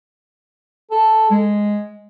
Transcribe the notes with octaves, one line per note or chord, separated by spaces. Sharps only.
A4
G#3